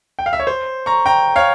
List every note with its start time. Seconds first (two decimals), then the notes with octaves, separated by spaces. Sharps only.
0.19 G5
0.26 F5
0.33 E5
0.40 C#5
0.47 C5
0.86 A#5 C#6
1.06 G5 A#5
1.36 C#5 F5